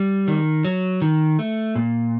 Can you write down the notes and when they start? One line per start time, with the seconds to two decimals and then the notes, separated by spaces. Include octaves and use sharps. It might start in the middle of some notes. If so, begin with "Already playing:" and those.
Already playing: G3
0.28 D#3
0.65 F#3
1.02 D#3
1.39 A3
1.76 A#2